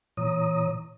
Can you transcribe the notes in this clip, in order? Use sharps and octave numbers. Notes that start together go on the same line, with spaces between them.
A#2 E3 C#5 A#5 D#6